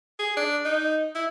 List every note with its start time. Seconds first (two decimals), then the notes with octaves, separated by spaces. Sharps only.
0.19 G#4
0.37 D4
0.65 D#4
1.15 E4